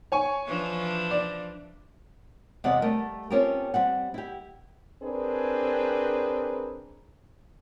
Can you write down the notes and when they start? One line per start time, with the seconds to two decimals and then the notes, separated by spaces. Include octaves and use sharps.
0.12 C#5 G#5 C#6
0.47 E3 F3 D4
1.11 D5
2.64 E2 C3 G3 G#3 D5 F#5
2.82 G3 A3 A#4
3.30 C4 C#4 F4 G4 A4 A#4
3.74 G3 C4 F#5
4.14 E4 G4
5.03 C4 D4 G#4 A#4 B4